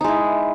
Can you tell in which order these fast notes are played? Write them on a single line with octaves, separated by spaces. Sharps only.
D#4 G#3 E4